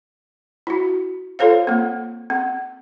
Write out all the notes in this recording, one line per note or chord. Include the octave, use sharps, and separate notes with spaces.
E4 F#4
F4 A4 C5 C#5 F5
A#3 C4
C4